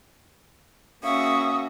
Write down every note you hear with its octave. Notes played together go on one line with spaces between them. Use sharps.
A#3 C#4 F#4 E5 F5 C#6 D#6